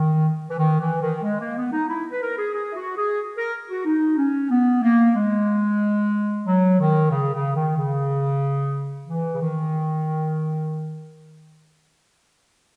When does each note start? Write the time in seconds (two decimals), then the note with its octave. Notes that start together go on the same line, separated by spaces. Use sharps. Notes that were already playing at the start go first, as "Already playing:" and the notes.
Already playing: D#3
0.50 E3
0.58 D#3
0.79 E3
1.01 D#3
1.23 G#3
1.39 A#3
1.56 B3
1.72 D#4
1.88 E4
2.11 B4
2.21 A#4
2.37 G#4
2.53 G#4
2.70 E4
2.75 F#4
2.97 G#4
3.36 A#4
3.68 F#4
3.85 D#4
4.17 C#4
4.50 B3
4.82 A#3
5.15 G#3
6.46 F#3
6.79 D#3
7.11 C#3
7.33 C#3
7.55 D#3
7.76 C#3
9.07 E3
9.33 C#3
9.40 D#3